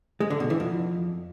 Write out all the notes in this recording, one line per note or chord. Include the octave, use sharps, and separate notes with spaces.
G#3
D3
B2
E3
F2